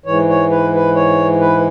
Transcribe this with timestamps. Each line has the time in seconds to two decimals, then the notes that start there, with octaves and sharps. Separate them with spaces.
0.06 G#2 E3 C#5
0.30 C#5
0.50 B4
0.74 B4
0.96 C#5
1.40 B4